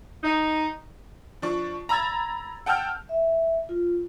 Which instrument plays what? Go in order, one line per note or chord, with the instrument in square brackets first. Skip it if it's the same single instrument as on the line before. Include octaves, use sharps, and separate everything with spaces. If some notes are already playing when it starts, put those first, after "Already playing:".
[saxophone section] D#4
[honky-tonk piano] F3 D4 C#6
A#5 B5 E6 G#6 A6
F#5 G5 A5 E6 F6 G6
[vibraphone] E5
F4